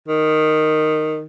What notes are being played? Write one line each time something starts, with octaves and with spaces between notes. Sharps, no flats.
D#3